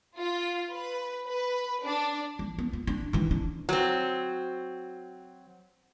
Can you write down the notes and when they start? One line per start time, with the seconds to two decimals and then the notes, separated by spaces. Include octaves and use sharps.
0.18 F4
0.72 B4
1.26 B4
1.83 D4
2.39 F3
2.59 B3
2.73 F4
2.87 D4
3.13 D#3 E3
3.31 D4
3.69 F#3 C4